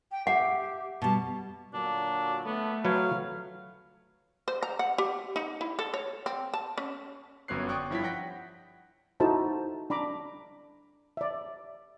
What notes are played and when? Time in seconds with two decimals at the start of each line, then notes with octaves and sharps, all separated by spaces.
0.11 G5
0.27 G4 E5 F#5
1.02 B2 G3 A5
1.74 A#2 D3 F#3 D4
2.45 A3 B3
2.85 F#3 B4 C#5 F5
4.48 C5
4.63 A#5
4.79 F#5
4.98 G4
5.36 D#4
5.61 E4
5.79 A4
5.94 C#5
6.26 C4
6.54 A5
6.78 C#4
7.48 G1 F#2 B3 C#5 F#6 C7
7.69 D5 G5 C#6 D#6 F#6
7.90 G2 F3 E4 C#5 G5 B6
8.04 F#5 G5 A#6 B6
9.20 D#4 E4 F#4 A4 C5 A5
9.90 D4 A#5 B5 D6
11.17 D5 E5